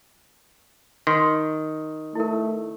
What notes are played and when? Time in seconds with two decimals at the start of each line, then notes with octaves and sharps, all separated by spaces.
1.07 D#3 C6
2.15 A3 E4 A#4